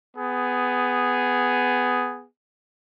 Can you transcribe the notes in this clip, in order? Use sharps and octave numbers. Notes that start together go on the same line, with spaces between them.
B3 G#4